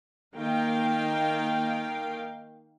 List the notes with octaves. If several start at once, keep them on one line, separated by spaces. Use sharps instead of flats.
D#3 A#3 A#4 F5 G5